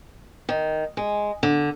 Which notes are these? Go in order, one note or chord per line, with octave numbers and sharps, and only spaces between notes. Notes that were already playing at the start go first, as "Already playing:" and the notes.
D#3
G#3
D3